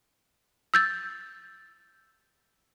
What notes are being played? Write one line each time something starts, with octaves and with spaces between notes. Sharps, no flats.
E6 G6 A6